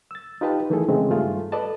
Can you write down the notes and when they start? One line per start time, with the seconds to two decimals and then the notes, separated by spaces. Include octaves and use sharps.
0.11 E6 A6
0.41 D#4 F4 G4 B4 G5 A5
0.70 D#3 E3 A3 E4 G#4 A4
0.89 C#3 E3 G#3 A3 C4
1.10 G2 D#3 G3 A3 F4 G#4
1.52 A4 B4 D5 D#5 A5